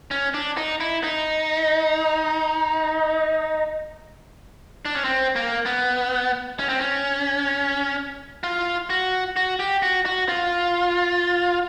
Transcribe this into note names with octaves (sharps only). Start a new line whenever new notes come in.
C#4
D4
D#4
E4
D#4
D4
C#4
C4
A#3
B3
C#4
C4
C#4
F4
F#4
F#4
G4
F#4
F#4
F4